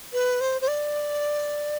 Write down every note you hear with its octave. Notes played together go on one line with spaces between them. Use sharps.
B4
C5
C5
D5